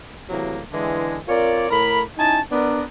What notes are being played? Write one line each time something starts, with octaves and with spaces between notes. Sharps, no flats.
A2 C3 E3 F#3 G3 A#3
D3 E3 G#3
C4 F4 A#4 C#5 D5
A2 A#4 B5
C#4 D#4 E4 G#5 A5
B3 D4 A#4